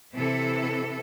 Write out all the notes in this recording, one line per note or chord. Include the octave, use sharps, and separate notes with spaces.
C3 E3 E4 A4